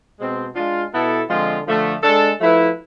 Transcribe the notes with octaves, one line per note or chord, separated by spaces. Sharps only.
B2 G#3 C4
G#3 D4 F4
B2 B3 E4 A4
D3 F3 G#3 C4 F4
D3 F3 A3
G#3 D4 A4
F3 A3 E4 B4